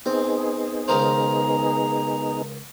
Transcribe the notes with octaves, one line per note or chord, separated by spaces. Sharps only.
B3 C4 D#4 G#4
C#2 D#3 C5 A#5